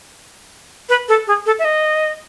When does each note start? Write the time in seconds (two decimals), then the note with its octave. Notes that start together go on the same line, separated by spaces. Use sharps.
0.89 B4
1.09 A4
1.27 G#4
1.46 A4
1.59 E5
1.65 D#5